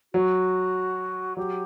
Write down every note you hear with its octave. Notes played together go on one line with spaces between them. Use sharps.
F#3 F#4
F#3 G4